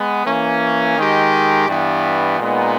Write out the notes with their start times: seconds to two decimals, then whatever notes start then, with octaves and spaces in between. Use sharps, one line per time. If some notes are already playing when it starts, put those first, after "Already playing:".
Already playing: G#3 B3
0.25 E3 A#3 C#4
0.96 D#3 G#3 D#4 G4
1.68 G2 E3 G3 B3
2.39 A#2 G#3 B3 D#4